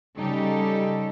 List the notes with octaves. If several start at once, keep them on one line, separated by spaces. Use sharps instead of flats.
C#3 G3 D#4 G4 A4